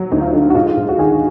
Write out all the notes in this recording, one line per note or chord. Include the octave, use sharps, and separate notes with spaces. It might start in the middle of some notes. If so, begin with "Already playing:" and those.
Already playing: F#3
D2 D#4
F4
D3 D#4
F#4
G#2 F4
G#2
F#4
D#3 G#4